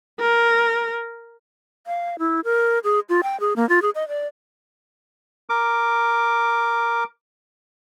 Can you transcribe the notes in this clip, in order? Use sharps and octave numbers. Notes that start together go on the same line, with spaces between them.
A#4
F5
E4
A#4
G#4
F4
G5
G#4
A#3
F4
G#4
D#5
D5
A#4 D6